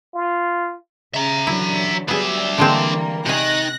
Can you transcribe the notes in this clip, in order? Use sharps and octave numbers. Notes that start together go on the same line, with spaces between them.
F4
C#3 E5 A#5
D3 E3 F#3 E4
F#3 G3 B3 D4 G#4 E5
D3 E3 G3 G#3 A#3 C4
C3 D#3 G#5 F#6 A#6